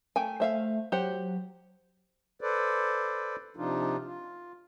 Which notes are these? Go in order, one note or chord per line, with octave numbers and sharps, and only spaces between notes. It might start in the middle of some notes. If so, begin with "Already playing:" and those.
A3 G5 G#5
A3 C5 E5 F5
F#3 G4 C5 F#5
A4 B4 C5 D5
C3 F3 D4 D#4 F4
F4